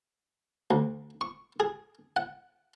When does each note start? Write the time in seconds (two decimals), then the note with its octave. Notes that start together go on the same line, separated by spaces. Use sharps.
0.71 D2
1.21 C#6
1.60 G#4
2.16 F#5